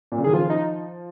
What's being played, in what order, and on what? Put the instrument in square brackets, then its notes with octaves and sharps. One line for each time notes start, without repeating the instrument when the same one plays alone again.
[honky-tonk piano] A#2
C#3
[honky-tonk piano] D#3 [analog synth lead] G#4
[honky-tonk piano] F3 [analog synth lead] F4
[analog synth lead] D#4